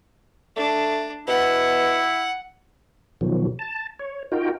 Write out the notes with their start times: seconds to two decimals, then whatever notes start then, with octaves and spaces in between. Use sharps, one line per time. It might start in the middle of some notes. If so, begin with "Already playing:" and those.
0.56 A3 D4
1.28 B2 E4 F#5
3.21 B2 D#3 F3 F#3
3.59 A5
3.99 C#5
4.32 D#4 F4 F#4 A#4 G5